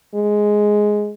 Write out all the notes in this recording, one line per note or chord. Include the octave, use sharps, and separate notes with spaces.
G#3